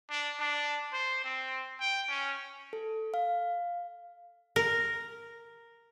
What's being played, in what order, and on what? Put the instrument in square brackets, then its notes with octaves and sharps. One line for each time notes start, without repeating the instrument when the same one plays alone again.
[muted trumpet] D4
D4
C5
C4
G5
C#4
[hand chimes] A4
F5
[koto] A#4